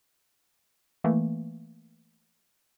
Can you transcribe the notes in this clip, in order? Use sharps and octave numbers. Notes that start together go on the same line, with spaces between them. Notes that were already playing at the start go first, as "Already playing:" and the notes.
E3 A3 A#3